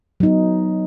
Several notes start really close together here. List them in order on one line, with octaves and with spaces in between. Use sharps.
F#3 D#4 B3